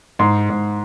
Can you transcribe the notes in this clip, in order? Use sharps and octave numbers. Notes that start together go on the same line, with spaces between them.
G#2 C6
G#2